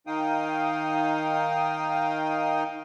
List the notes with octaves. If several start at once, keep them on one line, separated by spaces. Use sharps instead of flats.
D#3 D#4 F5 G5 D#6